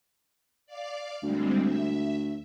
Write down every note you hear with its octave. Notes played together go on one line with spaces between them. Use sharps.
D5 F5 D6
D2 G3 G#3 C4
E5